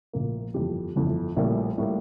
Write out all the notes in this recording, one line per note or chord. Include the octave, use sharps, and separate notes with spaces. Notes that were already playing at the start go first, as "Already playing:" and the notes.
A#1 A2 F3 A#3
G1 F2 E3 G4
G1 F2 E3
A#1 A2 G3 A#3
A2 G3 A#3